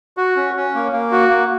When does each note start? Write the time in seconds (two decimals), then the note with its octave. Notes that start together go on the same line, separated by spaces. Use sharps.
0.17 F#4
0.36 C#4
0.56 C#4
0.75 A#3
0.92 A#3
1.11 F#4
1.30 A#3